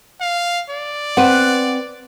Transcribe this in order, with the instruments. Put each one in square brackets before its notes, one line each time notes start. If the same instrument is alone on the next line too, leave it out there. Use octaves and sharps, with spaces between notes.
[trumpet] F5
D5
[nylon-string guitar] C4 C5 [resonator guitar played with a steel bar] B4 F#5